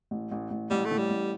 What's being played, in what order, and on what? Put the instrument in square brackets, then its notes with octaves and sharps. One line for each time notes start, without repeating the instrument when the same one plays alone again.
[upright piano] A1
A1
A1
[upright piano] A1 [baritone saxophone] G3
[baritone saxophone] A3
[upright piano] A2
[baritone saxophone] G3
[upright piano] A1